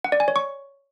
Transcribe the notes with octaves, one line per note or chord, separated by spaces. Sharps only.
F#5
D5
G#5
C#5
C#6